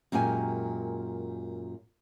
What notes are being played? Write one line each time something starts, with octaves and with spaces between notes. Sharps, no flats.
F#2 A#2 G#3 G4 G#5